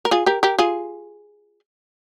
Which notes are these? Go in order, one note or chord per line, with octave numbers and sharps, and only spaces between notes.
A#4
F4 G#4
G4 A#4
G4 A#4
F4 G#4